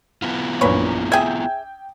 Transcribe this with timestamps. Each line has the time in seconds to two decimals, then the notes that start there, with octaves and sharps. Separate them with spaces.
0.22 B3 E4 F4
0.61 A#1 F#2 A#2 B4 C#5
1.12 G#4 E5 G5 G#6